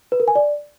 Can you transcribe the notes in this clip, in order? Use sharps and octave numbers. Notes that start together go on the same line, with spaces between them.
B4
A#4
G#5
D5